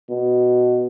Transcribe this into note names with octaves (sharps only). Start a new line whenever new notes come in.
B2